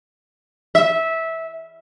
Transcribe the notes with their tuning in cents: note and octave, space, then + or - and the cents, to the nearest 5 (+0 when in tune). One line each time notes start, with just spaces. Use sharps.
E5 -15